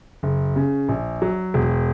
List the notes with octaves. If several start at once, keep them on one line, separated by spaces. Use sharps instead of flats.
F#1
C#3
A#1
F#3
E1